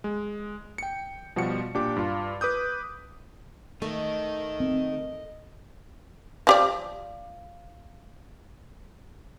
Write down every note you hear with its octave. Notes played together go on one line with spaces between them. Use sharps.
G#3
G5 C#7
B2 F3 G3 F#4 C#7
A#2 D4 G4 D6
G2 F4
B4 D6 D#6 G6
D#3 A3 D#4 D#5
C4
F3 G4 D5